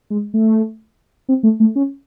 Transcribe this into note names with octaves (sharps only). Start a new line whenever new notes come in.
G#3
A3
C4
A3
A3
C#4